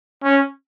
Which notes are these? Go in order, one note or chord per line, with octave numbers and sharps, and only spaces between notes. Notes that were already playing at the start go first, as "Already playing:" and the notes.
C#4